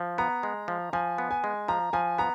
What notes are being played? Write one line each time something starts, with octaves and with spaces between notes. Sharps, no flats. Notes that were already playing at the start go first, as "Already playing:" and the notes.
Already playing: F3
B3 A#5
G#3
F3
F3 G#5
B3
G#5
G#3
F3 A#5
F3 G#5
B3 A#5